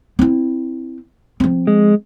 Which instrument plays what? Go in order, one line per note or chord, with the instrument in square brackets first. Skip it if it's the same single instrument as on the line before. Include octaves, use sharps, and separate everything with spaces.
[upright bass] C4 E4
F3 C4
[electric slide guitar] G#3